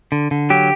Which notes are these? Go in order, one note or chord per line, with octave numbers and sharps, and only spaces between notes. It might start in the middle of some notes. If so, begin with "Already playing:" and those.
D3
D3
F#3 G4